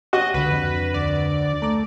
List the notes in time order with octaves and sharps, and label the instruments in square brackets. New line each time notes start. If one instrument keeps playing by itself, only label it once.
[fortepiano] F#4 [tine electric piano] G4 C#5 [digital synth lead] D#5
[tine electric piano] C#2 D3 [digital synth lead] B4
[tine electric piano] F2 D4
[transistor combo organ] D2 [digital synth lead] D5
[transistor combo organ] A3 [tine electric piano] A#5 D6